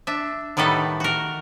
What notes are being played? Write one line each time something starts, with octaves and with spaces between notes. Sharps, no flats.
D4 E5
A2 D#3 G3 B3 A4
F#4 A#4